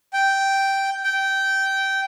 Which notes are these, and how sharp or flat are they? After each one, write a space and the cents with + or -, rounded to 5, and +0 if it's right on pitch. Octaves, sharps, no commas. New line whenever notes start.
G5 -5
G5 -15